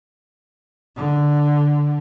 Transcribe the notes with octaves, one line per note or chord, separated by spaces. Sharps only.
D3